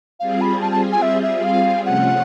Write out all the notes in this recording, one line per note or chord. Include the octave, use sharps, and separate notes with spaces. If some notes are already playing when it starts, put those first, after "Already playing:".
G3 C4 F4 G#4 F5
B5
A5
A5
G#5
E5
E5
F5
C3 F3 A3 C#4 F4 F#5